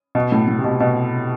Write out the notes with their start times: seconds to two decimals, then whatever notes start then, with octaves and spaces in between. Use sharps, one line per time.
0.15 B2
0.32 A2
0.48 A2
0.59 C3
0.64 B2
0.80 B2